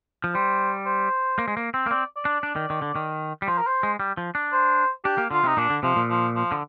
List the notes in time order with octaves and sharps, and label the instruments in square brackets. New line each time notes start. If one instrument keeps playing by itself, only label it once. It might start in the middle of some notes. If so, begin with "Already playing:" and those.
[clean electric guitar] F3
[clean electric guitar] G3 [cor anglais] C5
[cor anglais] C5
[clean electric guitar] A#3
G#3
A#3
C4
A#3
[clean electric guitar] C4 [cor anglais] D5
[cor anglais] D5
[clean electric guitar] D4
D4
D#3
D#3
D3
D#3
G3
[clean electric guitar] F3 [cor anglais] C5
[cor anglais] A#4
C5
[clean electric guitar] G#3
G3
F3
D4
[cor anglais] C5
[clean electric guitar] D4 [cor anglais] G4
[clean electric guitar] A#3
[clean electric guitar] D3 [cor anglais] F4
[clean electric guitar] C3 [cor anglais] D#4
[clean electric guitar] A#2 [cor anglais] D4
[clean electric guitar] D3
[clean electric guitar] C3 [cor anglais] F3
[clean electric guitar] A#2
[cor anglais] F3
F3
[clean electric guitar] D3